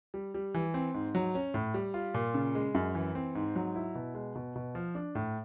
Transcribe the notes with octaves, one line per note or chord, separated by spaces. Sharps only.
G3
G3
E3
C4
G#2
F#3
C#4
A2
G3
F4
A#2
C#3
G#3
F#2
E3
C4
G#2
F#3
E4
B2
G#3
B2
B2
F3
D4
A2